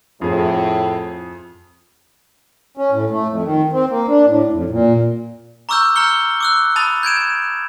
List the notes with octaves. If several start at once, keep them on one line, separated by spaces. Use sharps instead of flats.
F2 A2 G#4
C#4
A2
A3
F2
D#3
C4
A#3
D4
A2
F2
A#2
A#5 C#6 D6 E6 F6 G6
A#5 F6 G6 C#7 G7
D6 E6 F#6
A5 B5 D#6 A6 F7
G6 G#6 D7 E7